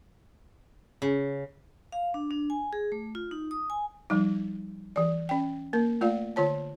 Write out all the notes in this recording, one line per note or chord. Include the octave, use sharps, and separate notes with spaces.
C#3
F5
D4
D4
G#5
G#4
A3
F4
D#4
D#6
G#5
F3 G3 D#4
E3 D5
C#4 G5
A#3 A#4
A3 F4 D5 F5
D3 F4 C#5 A5